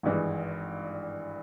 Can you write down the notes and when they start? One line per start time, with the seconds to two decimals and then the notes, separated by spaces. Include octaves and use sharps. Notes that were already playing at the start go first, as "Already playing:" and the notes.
0.03 G#1 G2 E3 G#3